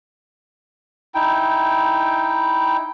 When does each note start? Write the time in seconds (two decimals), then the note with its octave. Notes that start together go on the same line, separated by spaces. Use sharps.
1.15 D#4 E4 G5